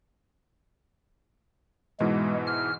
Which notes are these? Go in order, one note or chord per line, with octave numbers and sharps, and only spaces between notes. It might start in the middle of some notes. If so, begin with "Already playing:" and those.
G#2 B2 E3 G#3
F6